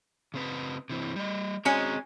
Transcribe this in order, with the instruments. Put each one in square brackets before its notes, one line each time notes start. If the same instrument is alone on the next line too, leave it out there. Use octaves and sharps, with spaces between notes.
[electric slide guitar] C#3 C4 B4
C3 E3 C4
G3 D#5
[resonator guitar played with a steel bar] G#3 C#4 [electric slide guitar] C4 F#4 A#5